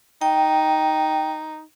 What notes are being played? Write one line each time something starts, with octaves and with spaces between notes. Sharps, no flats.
D#4 G5